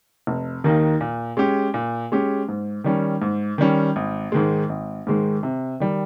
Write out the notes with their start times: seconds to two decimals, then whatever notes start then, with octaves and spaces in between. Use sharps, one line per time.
0.27 F1
0.64 D#2 D#3 A#3 D#4
1.01 A#2
1.37 G#3 C#4 G4
1.74 A#2
2.12 G#3 C#4 G4
2.49 G#2
2.84 D#3 G3 C#4
3.22 G#2
3.58 D#3 G3 C#4
3.96 G#1
4.32 G#2 D#3 G#3
4.69 G#1
5.07 G#2 D#3 G#3
5.43 C3
5.80 D#3 G3